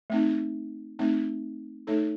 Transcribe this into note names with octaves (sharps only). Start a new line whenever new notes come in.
A3 C4 D#4
A3 C4 D#4
A3 D#4 A4 C#5